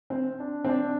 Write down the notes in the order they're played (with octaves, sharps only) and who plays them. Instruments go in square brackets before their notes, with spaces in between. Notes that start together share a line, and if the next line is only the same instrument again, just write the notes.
[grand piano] C4
D4
C4
D4